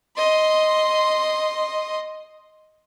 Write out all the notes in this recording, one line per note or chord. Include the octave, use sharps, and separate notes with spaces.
D#5 C6